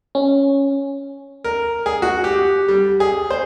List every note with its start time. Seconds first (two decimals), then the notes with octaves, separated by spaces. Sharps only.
0.15 C#4
1.44 A#4
1.86 G#4
2.02 F#4
2.24 G4
2.68 G3
3.00 G#4
3.30 C5